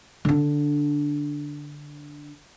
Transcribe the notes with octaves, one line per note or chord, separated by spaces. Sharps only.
D3 D4